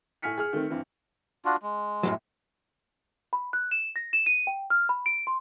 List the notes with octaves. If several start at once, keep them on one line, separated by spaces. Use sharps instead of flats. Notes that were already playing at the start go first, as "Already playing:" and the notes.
A2 G#5 F6 B6 C#7
G#4 F6
D#3 A3 C4
G2 E3 C4
D4 F4 F#4
G#3
F#2 A2 F#3
B5
F#6
E7
A#6
E7
D#7
G5
F6
B5
D7
C6